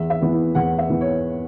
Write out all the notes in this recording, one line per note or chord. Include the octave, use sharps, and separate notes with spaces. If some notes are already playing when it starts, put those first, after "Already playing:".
Already playing: E2 E5
E5
E3 B3
E4
E2 F#5
E5
E3 B3
C#5